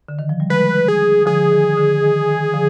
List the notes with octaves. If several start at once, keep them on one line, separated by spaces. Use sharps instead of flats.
D3
D#3
F3
G3
F3 G#3 B4
G#4
D3 F3 G#4
D#3
D3
D#3
D#3
D3 F3